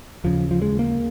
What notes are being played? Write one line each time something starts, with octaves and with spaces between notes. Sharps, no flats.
D#2 C#3 F3
F3
G#3
A#3